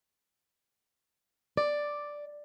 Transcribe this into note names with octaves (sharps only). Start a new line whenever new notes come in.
D5